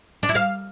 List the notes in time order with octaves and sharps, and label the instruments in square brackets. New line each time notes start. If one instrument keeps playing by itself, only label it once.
[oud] D4
E4
F5